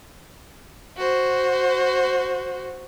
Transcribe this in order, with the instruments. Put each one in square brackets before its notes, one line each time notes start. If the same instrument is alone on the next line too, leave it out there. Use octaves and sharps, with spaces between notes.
[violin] F#4 C5